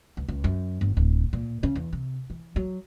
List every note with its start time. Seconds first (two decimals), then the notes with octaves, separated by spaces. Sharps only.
0.17 C#2
0.28 C#2
0.44 F#2
0.81 G1
0.97 D1
1.33 A#2
1.63 C#3
1.75 E2
1.93 C3
2.30 E3
2.56 F#3